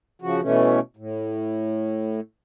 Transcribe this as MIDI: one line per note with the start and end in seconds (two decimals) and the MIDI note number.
0.22 0.41 49
0.22 0.41 53
0.22 0.41 66
0.42 0.79 47
0.42 0.79 52
0.42 0.79 57
0.42 0.79 61
0.97 2.20 45